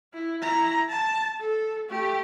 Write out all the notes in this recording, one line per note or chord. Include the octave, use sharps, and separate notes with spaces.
E4
E4 A#5
A5
A4
A3 G4